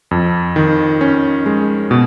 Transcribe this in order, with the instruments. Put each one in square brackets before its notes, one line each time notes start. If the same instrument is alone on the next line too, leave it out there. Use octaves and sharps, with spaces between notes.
[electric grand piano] F2
D#3
C#4
G#3
B2